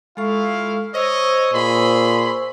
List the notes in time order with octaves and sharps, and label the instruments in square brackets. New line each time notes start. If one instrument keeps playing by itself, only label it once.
[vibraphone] G#3 A4 C#6 [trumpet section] E4 F4 F5
[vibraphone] C5 C#6 E6 [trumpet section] C#5 D#5
[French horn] A#2 [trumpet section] G#4 B5 C6